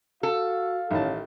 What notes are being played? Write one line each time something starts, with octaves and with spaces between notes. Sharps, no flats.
F#4 A4 F5
A1 D#3 C#4 A5